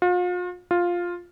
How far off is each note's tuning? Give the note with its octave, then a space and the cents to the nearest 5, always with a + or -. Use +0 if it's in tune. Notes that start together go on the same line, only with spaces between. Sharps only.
F4 +40
F4 +5